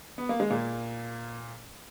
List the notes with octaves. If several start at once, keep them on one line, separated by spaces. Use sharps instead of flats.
B3
A#3
G#3
A#2 A#3